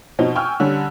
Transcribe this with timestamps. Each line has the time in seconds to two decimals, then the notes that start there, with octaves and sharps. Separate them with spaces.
0.19 B2 F3 C4 D#4
0.35 G5 G#5 C#6 E6 F6
0.60 D3 G3 C#4 D4